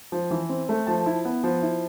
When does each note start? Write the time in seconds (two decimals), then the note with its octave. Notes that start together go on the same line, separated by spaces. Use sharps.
0.12 F3
0.31 E3
0.49 C4
0.69 A3
0.87 F3 A5
1.06 E4
1.25 B3
1.44 F3
1.62 E4